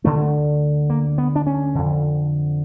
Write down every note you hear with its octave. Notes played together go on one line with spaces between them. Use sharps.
D2 D3 A3
A#3
B3
D4
C#4
F2 D3